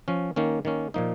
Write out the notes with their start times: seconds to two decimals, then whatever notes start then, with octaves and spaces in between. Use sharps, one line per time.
0.08 F3 C#4
0.36 D#3 A#3 C#4
0.65 D#3 A#3 C#4
0.94 A#2 F3 A#3 D#4